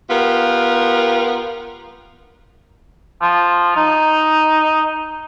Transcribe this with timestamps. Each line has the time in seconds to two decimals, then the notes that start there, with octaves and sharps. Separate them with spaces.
0.09 B3 F4 G4 A#4
3.22 F3
3.76 D#4